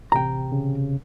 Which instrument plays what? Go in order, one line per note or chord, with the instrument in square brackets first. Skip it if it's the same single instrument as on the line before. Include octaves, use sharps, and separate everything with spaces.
[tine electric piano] A1 C3 [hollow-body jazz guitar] G5 A#5
[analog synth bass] C#3